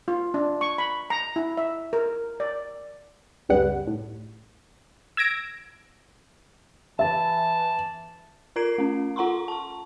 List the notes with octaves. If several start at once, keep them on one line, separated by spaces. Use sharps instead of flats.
F4
D4
C#6
B5
A#5
E4
E5
A#4
D5
C#2 F#2 C#3 G3 B3 F#5
A2
E6 G#6 A#6 D7
E3 E5 A5
F4 A#4 A#5 G#6 C7 D7
A3 C#4
F4 F#5 A#5 C6 C#6
A5 C#6